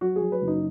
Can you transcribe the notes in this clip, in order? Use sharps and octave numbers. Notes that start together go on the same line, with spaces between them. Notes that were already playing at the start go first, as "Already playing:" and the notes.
F#3 F#4
G#4
F#3
B4
F#1
D#4